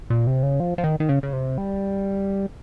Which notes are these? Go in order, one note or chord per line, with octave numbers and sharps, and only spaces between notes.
A#2
C3
C#3
F3
F3
D#3
D#3
C#3
C#3
C3
G3